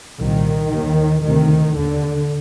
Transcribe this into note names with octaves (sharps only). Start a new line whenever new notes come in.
C2 A#2 D#3
D#2
D2 C3 D#3
D#2 D3